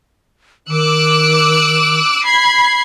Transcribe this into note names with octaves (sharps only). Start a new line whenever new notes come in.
D#3 D6 E6 F#6
B5 G#6 C7